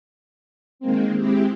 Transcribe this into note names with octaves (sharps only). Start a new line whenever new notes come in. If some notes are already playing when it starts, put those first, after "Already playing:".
D#3 G#3 A#3 C4
G#3 C4 E4 G4